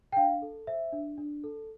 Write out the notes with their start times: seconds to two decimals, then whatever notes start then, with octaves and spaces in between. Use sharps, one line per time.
0.12 G5
0.17 D4 F5
0.42 A4
0.67 C5 E5
0.93 D4
1.18 D4
1.44 A4